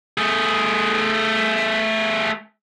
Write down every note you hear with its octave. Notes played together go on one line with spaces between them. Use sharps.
A3 G#4